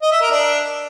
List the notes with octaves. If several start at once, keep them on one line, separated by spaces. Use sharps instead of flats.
D#5
E5
A#4
D4